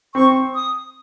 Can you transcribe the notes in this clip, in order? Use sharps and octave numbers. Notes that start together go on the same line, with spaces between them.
C4 C#6
D#6